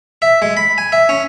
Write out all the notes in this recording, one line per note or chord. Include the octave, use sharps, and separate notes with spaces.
E5
G#3
B5
G#5
E5
C#4